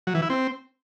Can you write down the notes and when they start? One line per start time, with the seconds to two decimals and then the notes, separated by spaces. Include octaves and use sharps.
0.07 F#3
0.15 E3
0.22 E4
0.30 C4